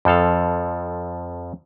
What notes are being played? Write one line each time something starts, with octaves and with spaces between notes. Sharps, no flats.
F2 F3 A4 F5